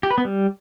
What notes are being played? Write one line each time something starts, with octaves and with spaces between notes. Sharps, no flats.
G4
B4
B3
G3